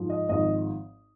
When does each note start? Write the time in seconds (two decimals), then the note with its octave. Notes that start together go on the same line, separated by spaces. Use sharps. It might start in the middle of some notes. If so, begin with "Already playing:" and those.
Already playing: G#2 F3
0.10 D#5
0.29 G#1 G#2 F3 D#5